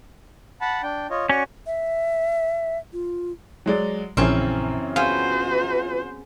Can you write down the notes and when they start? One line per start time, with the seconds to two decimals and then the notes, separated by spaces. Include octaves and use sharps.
0.61 F#5 A5 B5
0.83 D4 G5
1.10 F4 C#5 D#5
1.29 C#4 F#4 D5 C#6
1.66 E5
2.93 F4
3.66 F#3 G#3 D5
4.17 A#1 F#2 C#3 E3 C4 C#4
4.96 B3 F4 F#4 G#4 C5